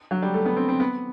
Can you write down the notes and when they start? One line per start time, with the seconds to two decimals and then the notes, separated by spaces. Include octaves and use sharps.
0.11 F#3
0.22 G3
0.34 A3
0.46 B3
0.57 C4
0.69 C4
0.80 B3